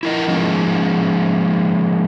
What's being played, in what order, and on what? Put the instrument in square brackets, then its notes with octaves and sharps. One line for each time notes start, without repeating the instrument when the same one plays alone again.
[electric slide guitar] E4 A#4 D#5
F3 G#3 A#3 C#4